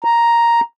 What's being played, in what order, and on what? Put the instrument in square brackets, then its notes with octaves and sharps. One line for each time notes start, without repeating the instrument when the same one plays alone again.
[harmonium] A#5